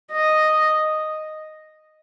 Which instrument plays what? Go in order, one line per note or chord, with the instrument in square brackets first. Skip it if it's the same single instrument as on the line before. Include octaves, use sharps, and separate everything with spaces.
[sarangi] D#5